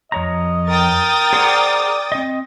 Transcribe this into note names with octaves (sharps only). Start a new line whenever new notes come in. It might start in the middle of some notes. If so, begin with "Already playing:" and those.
F2 C#5 D#5 A#5
A#4 G5 D#6 A6
G#4 C5 D5 F#5
C4 D#5